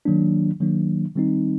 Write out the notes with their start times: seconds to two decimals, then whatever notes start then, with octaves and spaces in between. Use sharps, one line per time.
0.05 D#3 F#3 A#3 D4
0.60 D#3 F#3 A#3 D4
1.16 D#3 G3 C4 D#4